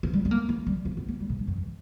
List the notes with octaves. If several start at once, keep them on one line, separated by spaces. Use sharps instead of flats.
A#3
G3
B3
A#3
A#3
G3
A#3
B3
A#3
G3
A#2
G2
F#2
E2